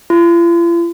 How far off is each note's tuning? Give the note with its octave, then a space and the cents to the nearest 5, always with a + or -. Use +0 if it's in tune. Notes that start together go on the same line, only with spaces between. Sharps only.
F4 -45